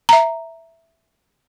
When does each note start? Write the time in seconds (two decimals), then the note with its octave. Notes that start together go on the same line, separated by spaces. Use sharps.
0.09 E5 A#5